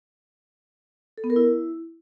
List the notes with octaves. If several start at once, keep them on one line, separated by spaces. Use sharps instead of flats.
A4
B3
A#4
E4